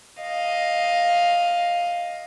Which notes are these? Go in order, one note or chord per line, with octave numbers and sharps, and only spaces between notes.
D#5 F5